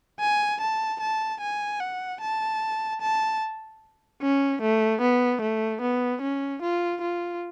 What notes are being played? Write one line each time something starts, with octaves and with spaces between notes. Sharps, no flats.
G#5
A5
A5
G#5
F#5
A5
A5
C#4
A3
B3
A3
B3
C#4
F4
F4